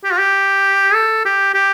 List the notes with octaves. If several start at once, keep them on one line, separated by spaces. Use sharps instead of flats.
G4
F4
G4
A4
G4
G4